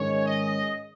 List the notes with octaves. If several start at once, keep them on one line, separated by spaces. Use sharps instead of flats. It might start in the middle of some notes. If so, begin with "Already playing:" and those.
Already playing: G#2 D#3 G#3 C#4 C#5
D#5